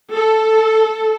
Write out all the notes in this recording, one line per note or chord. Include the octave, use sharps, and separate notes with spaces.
A4